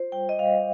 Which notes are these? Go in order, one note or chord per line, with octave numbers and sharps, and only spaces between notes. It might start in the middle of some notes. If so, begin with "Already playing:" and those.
Already playing: F4 C5
G3 G5
D#5
G3 F5